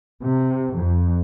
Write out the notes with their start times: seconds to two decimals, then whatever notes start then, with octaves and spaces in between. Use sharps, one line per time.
0.24 C3
0.75 F2